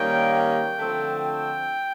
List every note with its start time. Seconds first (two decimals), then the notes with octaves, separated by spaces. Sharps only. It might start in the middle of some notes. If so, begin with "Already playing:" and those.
Already playing: D#3 G3 A#3 C#4 G5
0.34 G5
0.79 D3 F3 A3 C4
1.24 G5